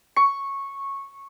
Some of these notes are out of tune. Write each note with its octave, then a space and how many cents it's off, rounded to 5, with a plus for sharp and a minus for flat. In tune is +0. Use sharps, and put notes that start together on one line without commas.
C#6 -10